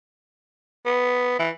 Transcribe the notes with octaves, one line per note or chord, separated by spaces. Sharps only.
B3
E3